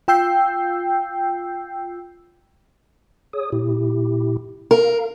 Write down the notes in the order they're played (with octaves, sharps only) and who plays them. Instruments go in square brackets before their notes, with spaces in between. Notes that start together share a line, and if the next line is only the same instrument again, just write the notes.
[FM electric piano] F4 G5 E6 G6 C7
[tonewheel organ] G#4 C#5 D#6
A#2 E4 G4
[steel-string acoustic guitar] A#4 [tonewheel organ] F5